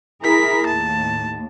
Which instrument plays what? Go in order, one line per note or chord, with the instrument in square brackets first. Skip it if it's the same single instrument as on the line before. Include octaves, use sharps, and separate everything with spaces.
[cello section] E4 G#4 A#4 [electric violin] B6
[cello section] D#2 A2 [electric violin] A5